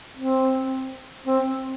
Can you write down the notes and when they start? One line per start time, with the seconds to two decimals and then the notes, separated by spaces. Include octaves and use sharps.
0.17 C4
1.26 C4